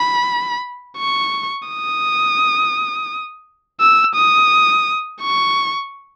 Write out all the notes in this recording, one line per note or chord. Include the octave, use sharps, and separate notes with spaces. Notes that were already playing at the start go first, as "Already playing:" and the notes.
Already playing: B5
C#6
D#6
E6
D#6
C#6